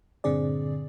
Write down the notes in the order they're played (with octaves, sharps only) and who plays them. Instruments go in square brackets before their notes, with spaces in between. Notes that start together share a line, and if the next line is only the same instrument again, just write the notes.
[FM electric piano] G2 A#2 D3 C4 G#4 D5